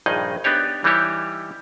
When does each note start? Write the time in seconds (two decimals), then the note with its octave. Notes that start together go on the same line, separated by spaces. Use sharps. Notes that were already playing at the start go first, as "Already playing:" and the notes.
0.06 A#1 G2 D#3 D#4 G#4 D#5
0.44 B3 D4 D#4 G4 C#5
0.84 E3 G3 D#4 E4 G4 C#5